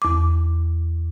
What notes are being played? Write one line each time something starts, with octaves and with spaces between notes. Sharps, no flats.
E2 D6